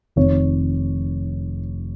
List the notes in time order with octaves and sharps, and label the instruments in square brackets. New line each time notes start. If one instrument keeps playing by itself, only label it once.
[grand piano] F1 F2 D#3 C#5